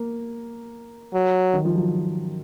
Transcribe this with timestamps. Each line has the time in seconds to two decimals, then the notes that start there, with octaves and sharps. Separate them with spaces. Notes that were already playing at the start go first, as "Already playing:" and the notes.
Already playing: A#3
1.13 F#3
1.53 D#3
1.65 F3
1.75 F#3